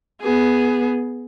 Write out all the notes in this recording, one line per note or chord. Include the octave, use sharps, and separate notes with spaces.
B3 G#4